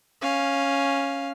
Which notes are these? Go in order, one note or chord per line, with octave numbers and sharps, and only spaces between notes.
C#4 F5